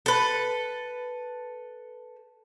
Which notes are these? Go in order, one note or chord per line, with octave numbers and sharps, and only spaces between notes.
A4 B4